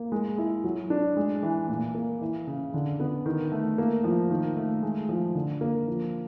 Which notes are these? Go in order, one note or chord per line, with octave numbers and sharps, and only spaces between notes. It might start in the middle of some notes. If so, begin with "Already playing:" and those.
Already playing: A#3
G#3
E4
F#3
D4
G#3
E3
A#2
A#3
E3
C#3
D3
B3
D#3
A3
A#3
F3
D#3
A3
G#3
F3
D3
A#3
F3